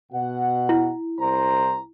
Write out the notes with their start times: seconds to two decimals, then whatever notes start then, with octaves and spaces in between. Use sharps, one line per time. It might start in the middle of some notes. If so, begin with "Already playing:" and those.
0.11 B2 F#5
0.69 E4
1.19 C2 C5 A#5